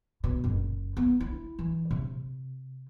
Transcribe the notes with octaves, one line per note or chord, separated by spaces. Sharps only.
B2
F#1
B3
E4
E3
C3